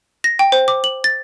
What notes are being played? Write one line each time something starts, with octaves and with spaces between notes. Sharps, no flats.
A#6
G5
C5
D6
F#7
A6